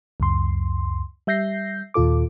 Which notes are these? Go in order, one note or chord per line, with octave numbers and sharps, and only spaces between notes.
C#2 F#2 C6
G3 E5 G6 A#6 C7
D#2 A#2 F4 A4 D6